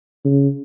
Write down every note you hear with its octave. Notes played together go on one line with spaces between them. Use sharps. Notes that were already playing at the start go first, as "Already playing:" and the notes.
C#3